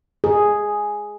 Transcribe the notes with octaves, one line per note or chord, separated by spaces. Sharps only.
G#4